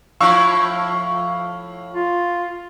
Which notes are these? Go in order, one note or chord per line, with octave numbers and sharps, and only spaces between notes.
A2 F3 E4 F5 C#6 E6
F4